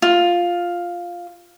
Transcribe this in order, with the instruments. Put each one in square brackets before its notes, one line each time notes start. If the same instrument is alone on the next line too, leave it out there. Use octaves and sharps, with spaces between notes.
[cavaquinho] F4